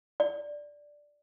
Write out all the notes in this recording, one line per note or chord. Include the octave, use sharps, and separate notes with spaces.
D5